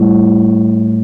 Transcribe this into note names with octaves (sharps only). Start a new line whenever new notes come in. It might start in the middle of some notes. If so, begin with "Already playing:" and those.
Already playing: A2 G3